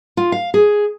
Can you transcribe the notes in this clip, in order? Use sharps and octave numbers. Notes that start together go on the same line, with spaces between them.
F4
F5
G#4